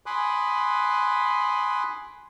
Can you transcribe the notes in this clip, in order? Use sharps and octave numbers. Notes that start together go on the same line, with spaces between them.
G#5 B5 C6 D6 D#6 F#6